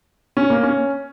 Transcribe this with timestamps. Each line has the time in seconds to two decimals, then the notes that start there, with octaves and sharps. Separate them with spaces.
0.37 C#4
0.50 A#3
0.63 C#4